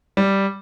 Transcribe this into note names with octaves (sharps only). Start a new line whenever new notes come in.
G3